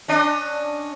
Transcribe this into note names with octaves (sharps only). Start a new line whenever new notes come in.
C#4 D4 D#5